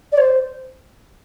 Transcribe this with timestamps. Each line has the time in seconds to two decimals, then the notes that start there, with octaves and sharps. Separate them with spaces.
0.12 D5
0.18 C5